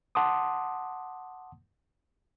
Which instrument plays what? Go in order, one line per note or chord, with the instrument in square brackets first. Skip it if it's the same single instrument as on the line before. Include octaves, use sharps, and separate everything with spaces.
[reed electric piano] F#5 A5 C6 D6 D#6